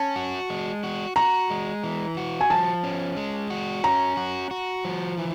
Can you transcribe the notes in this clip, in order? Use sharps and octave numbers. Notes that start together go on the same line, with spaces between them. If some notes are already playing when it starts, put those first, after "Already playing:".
Already playing: C#4 A5
F#4
G#3
F#4
F#4 A#5
G#3
E3
F#4
G#5
F3 A5
C#4
G#3
F#4
C#4 A#5
F#4
F#4
F3
E3